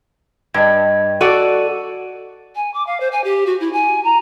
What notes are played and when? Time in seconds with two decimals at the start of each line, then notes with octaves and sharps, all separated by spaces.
0.54 G2 D#5 G#6
1.21 F#4 A4 D5 D#7
2.55 G#5
2.74 D6
2.86 F5
3.00 C5
3.12 G#5
3.24 G4
3.46 F#4
3.60 E4
3.73 G#5
4.04 A#5